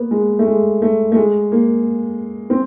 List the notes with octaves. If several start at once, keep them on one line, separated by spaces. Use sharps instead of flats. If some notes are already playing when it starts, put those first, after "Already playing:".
Already playing: A#3 B3
G#3
A3
G#3
A3
A3
G#3
A#3
C4